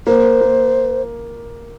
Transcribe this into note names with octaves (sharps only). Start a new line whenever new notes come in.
A#3 C5
A#3